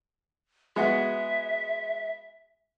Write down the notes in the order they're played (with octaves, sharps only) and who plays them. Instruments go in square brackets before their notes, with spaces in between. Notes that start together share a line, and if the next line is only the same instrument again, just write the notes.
[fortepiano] G#3 B3 F#4 [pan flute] E5